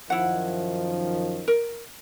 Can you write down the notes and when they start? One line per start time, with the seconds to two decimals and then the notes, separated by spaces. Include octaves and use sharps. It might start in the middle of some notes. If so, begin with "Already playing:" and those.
0.10 F#2 D#3 F3 E4 F#5
1.48 A#4